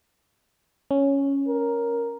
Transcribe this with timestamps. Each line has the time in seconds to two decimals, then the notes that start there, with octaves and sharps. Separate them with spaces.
0.91 C#4
1.47 A#4